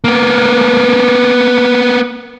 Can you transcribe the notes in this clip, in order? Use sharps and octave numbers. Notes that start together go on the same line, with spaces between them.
A#3 B3